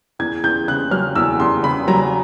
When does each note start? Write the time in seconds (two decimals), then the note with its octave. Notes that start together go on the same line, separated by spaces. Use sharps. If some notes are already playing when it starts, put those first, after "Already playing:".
0.19 E2 G#6
0.43 E2 G6
0.68 C#3 F#6
0.91 F#3 F6
1.15 E2 E6
1.40 E2 C6
1.63 C#3 B5
1.88 F#3 A#5